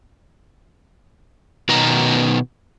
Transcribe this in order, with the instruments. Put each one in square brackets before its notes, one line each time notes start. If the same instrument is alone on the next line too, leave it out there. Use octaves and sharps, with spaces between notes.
[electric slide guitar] B2 D#3 B3 D#4 A#5